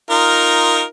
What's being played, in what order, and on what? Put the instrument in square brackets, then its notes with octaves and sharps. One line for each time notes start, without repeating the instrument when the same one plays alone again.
[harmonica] D#4 F4 A#4